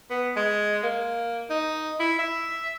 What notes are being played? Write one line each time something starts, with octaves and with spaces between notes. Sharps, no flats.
B3
G#3
A#3
D#4
E4
E5